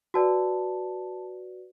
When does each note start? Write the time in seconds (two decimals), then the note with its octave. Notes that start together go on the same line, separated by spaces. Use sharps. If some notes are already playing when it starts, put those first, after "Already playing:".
0.14 F#4 B4 D5 A5